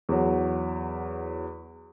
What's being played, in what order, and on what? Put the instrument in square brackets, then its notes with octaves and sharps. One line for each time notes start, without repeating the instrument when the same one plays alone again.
[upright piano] E2 F#3